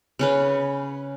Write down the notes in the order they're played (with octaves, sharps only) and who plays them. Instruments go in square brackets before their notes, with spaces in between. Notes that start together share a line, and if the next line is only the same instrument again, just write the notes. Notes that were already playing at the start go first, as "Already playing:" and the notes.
[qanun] C#3 C#4 B4